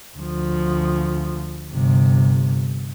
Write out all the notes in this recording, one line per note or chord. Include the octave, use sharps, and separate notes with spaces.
D2 F3
G1 C3